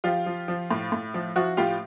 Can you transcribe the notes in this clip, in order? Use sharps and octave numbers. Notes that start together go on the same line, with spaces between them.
F3 F4 G4
F3
F3
A2
A2
F3
F3 E4 F#4
A2 F4 G4